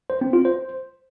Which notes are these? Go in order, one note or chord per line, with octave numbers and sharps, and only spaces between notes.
C5
C4
F4
C5